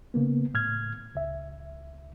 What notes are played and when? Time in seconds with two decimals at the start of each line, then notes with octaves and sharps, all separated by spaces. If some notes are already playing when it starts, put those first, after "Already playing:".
0.14 C#3 A#3 B3
0.54 A2 F6 G#6
1.15 C#2 E5